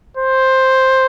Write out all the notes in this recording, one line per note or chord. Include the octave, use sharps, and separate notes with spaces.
C5